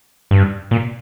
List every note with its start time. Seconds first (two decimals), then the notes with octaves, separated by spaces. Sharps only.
0.31 G2
0.71 A#2